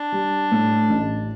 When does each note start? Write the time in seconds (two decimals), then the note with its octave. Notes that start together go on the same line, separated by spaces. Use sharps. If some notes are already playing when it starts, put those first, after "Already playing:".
Already playing: D4
0.12 G3
0.52 A2
0.90 A1